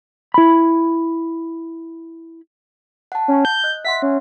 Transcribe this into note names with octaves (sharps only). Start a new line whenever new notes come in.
E4 B5
F#5 A5
C#4
G6
D#5 F#6
E5 F#5 C6 B6
C#4